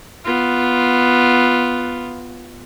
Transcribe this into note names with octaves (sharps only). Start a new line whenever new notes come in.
B3 F4